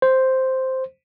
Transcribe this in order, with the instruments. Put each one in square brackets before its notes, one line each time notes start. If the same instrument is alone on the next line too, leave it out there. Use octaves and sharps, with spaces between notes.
[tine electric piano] C5